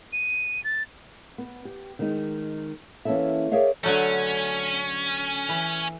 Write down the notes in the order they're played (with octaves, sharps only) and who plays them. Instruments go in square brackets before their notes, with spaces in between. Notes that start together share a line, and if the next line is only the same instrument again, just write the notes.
[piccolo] D#7
A6
[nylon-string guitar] B3
G4
D#3 G#3 D#4
E3 A#3 C#4 E4 A4 E5
G#4 A#4 C#5 D5 E5 F5
[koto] D3 F#3 A3 [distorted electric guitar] C#4
[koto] E3